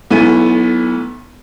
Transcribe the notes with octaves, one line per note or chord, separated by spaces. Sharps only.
B1 A3 B3 E4 G#5 D#7